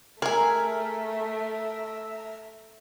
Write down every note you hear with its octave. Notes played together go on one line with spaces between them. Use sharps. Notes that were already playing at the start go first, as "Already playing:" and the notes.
A3 G#4 A#4 E5 G#5